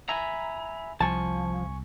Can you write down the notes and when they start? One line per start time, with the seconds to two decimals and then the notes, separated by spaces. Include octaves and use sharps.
0.09 E5 G#5 A#5 B5
1.00 C2 F3 G#5 A5 C#6